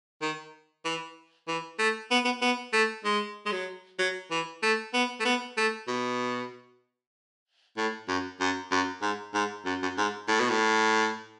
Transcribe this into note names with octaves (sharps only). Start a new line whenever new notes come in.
D#3
E3
E3
A3
B3
B3
B3
A3
G#3
G#3
F#3
F#3
E3
A3
B3
A3
B3
A3
B2
A2
F#2
F#2
F#2
G#2
G#2
F#2
F#2
G#2
A2
B2
A2